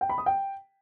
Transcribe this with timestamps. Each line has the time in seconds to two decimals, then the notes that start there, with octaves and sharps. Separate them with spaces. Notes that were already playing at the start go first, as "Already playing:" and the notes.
0.01 G5
0.09 B5
0.18 D#6
0.26 G5